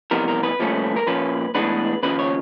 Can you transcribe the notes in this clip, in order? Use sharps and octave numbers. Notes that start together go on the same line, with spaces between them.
F2 C3 E3 G3 B3 A#4
A#4
B4
C2 A#2 F3 A3 C#4
A#4
A#2 F3 A#3 C#4 B4
A2 E3 G#3 B3 D4 B4
D#2 C#3 F3 B4
C#5